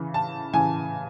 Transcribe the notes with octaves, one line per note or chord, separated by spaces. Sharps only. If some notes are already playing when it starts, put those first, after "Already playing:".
Already playing: C#3 E3
A5
C#3 E3 G#5